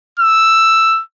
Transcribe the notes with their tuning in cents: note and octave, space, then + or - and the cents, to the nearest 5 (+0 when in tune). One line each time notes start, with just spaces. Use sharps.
E6 +5